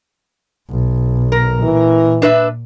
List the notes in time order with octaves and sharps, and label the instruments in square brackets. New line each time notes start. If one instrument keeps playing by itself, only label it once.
[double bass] B1
[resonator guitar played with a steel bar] A#4
[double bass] A#2 [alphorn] E3
[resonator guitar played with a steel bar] D4 B4 E5